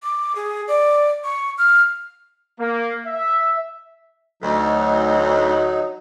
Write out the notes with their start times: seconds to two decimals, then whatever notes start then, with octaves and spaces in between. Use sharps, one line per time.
0.03 D6
0.36 G#4
0.68 D5
1.24 C#6
1.58 F6
2.59 A#3
3.06 E5
4.43 D2 F#3 D#4